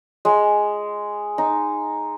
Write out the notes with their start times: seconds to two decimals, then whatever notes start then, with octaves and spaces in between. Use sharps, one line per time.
0.25 G#3
1.38 D#4